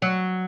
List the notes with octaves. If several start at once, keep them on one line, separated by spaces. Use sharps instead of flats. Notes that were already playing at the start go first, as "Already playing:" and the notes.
F#3